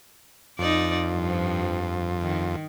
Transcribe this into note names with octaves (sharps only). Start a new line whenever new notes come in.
F2 D#4 D5
G2 F3
D#3